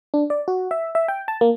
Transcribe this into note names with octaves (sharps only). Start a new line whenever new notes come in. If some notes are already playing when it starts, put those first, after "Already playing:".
D4
D5
F#4
E5
E5
G5
A5
A#3